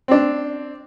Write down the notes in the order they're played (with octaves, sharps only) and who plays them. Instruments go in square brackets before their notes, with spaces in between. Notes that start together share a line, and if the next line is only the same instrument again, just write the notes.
[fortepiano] C4 D4